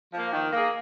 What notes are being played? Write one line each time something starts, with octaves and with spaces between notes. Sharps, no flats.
F3 A#3
D#3
A#3 G#4